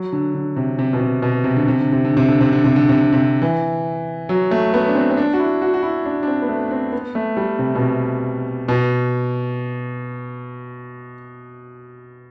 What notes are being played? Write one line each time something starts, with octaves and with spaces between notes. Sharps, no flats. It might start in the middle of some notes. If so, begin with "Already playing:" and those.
Already playing: F#3
D3
D3
C3
C3
B2
C3
B2
C3
D3
C3
D3
C3
D3
C3
D3
C3
D3
C3
D3
C3
D3
C3
E3
F#3
A3
B3
D4
C4
C4
D4
F#4
E4
F#4
F#4
E4
D4
D4
C4
B3
A3
C4
B3
A3
G3
C3
B2
C3
B2